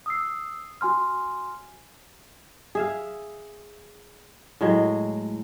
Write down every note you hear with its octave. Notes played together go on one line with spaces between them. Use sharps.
D#6 E6 C7
F#4 G#5 C6 F6
G#4 E5 F5
A2 F#3 G#3